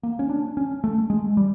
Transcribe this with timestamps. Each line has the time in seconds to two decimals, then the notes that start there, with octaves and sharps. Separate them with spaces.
0.03 A#3
0.19 C#4
0.30 D4
0.57 C#4
0.84 A3
1.10 G#3
1.37 G3